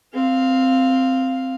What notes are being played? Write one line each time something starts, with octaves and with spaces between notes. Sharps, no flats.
C4 F5